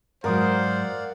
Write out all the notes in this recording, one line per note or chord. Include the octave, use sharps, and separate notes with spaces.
G#2 F#3 A#4 C5 D5 F5 F#5 D#6